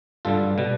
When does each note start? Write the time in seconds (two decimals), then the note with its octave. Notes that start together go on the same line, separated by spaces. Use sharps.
0.25 G2 D3 G3 F4 A4
0.58 B2 G3